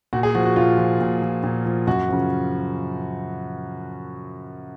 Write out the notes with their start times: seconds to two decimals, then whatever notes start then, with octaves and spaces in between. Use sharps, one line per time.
0.13 A#2 F#4
0.23 G#4
0.35 F3 F#4
0.45 F#4
0.56 A#2 F4
0.78 F3
1.00 A#2
1.22 F3
1.43 A#2
1.65 F3
1.87 F#2 F#4
2.08 C#3 F3